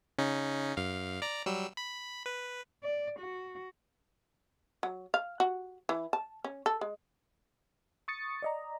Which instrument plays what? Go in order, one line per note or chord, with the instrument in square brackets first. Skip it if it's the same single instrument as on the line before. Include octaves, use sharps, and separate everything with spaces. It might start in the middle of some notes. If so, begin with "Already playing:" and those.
[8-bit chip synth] C#3 C#4 D#4
F#2 F5
D5 A#5
F#3 G3 E6
B5
B4
[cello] D5
F#4
[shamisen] F#3
F5
F#4
E3
A5
C#4
A4
G#3
[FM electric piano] C#6 D#6 A6 C#7
D5 D#5 A#5